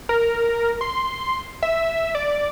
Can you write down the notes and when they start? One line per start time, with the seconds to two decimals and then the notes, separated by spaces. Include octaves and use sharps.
0.09 A#4
0.81 C6
1.63 E5
2.15 D5